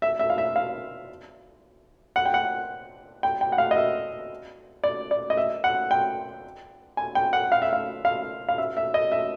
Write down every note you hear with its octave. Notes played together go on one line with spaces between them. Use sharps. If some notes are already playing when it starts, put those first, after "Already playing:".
E5
E5
F5
E5
F5
F#5
G5
F#5
G5
G5
F#5
F5
D#5
E5
D5
D5
D#5
E5
F#5
G5
G#5
G5
F#5
F5
E5
F5
F5
F5
E5
E5
D#5
E5